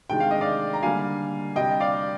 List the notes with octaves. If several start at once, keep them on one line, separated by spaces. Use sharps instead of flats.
C3 D#3 G#3 D4 G5
F5
D#5
D5 F5
A#5
D3 G3 A#3 D4 F5 G#5
C3 G3 D4 D#5 G5
D5 F5